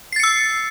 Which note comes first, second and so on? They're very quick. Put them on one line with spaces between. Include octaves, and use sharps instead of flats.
C7 A6 C#7 E6